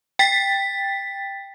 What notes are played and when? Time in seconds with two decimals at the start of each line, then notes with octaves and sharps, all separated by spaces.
0.19 G5 A6 B6